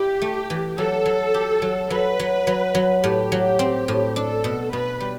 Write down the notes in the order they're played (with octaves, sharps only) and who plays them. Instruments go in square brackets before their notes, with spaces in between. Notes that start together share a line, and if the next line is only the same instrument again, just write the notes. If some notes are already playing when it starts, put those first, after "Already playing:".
Already playing: [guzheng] E4 [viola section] G4
[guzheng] A3
E3
[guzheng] F#3 [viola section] A4
[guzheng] F#3
G4
F#3
[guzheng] F#3 [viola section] B4
[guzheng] F#3
F#3
F#3
[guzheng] A2 [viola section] G4
[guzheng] F#3
C4
A2
[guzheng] D4 [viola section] A4
[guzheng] B2
[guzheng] B2 [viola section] B4
[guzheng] G3